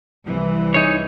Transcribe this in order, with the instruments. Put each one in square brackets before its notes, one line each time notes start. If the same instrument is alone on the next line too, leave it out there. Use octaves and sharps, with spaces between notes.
[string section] C2 E3
[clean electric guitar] D#4 G#4 C#5